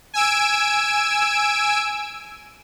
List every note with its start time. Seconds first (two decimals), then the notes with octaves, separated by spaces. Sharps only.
0.14 G#5 E6 D7